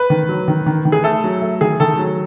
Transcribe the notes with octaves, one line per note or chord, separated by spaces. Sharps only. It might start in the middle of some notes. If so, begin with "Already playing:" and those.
Already playing: B4
D#3
F#3
D#3
D#3
D#3
G#4
A3 A4
F#3
A3
D#3 G#4
D#3 A4
F#3